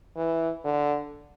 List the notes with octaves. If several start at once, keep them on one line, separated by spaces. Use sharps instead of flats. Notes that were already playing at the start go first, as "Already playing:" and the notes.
E3
D3